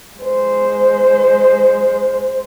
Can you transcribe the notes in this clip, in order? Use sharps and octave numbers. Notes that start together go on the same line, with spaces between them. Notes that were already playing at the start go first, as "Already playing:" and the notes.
G#3 C5